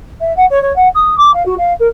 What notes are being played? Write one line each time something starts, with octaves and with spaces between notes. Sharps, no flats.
E5
F#5
C#5
C#5
F#5
D#6
D6
F5
F#4
F5
A#4